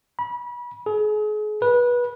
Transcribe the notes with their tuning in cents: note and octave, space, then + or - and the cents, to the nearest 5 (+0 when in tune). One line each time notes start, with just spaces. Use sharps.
B5 -30
G#4 +35
B4 -25